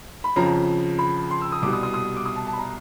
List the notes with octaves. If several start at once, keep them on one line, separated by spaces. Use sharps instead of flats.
B5
F2 C#3 F3 A#5
B5
C6
E6
D#6
C2 B2 G3 D6
D#6
D#6
D#6
D6
D#6
A5
A5
B5
A#5